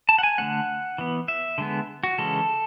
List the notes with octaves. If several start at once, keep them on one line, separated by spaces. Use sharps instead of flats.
A5
F#5
G#5
D3 A3 C#4 F#5
E3 B3
E5
D3 G#3 B3
F#4
C#3 E3 G#3 C#4 A4